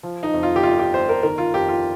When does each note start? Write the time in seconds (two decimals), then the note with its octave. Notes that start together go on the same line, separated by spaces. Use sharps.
0.03 F3
0.23 D#4
0.34 F2
0.43 F4
0.56 G4
0.63 G1 F4
0.79 G4
0.94 G1 C5
1.09 A#4
1.23 D#3 A#4
1.38 F4
1.54 F2 G4
1.68 F4